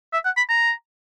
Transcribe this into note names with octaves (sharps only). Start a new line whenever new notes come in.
E5
F#5
B5
A#5